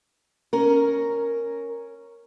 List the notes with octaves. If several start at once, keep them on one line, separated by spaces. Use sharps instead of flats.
C#4 A#4